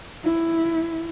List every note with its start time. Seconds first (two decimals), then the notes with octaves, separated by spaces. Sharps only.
0.24 E4